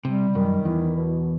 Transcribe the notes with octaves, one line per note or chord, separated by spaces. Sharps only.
C3 G3
F#2 D#3
E2 E4
B2